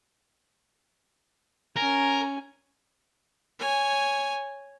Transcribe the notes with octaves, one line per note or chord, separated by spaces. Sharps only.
C#4 A#4 G#5
C#5 G#5